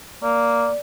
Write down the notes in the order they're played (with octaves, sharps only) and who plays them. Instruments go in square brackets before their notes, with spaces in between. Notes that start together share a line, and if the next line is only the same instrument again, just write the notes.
[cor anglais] A#3 [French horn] D5